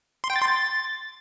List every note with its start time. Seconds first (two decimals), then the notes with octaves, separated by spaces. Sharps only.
0.24 C6
0.30 G5
0.36 A6
0.42 C6
0.48 A6